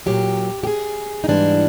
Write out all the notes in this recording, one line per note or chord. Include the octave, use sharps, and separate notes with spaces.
A#2 F#3 G4
G4
G#4
D#4
G#2 E3 G3 D4